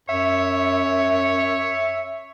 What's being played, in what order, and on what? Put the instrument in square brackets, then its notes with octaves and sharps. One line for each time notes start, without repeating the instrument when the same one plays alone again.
[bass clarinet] F#2 [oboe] C#5 [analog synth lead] E5